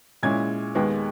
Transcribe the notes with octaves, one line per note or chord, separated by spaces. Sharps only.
A#2 G#3 C#4 E4 G#6
D#2 D#3 G#3 B3